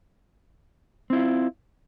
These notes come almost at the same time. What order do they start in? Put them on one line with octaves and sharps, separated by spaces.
C4 E4 F4